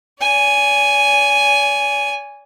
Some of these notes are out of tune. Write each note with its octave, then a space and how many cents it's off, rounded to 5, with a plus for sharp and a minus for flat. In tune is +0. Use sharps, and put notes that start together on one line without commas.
D5 -45 G#5 +0